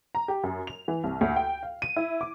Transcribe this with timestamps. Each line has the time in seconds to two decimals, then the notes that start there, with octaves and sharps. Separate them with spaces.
0.15 A#5
0.28 G4
0.43 F#2
0.67 F7
0.88 E3
1.04 C2
1.21 D2
1.36 G5
1.63 F5
1.82 D#7
1.96 E4
2.21 D6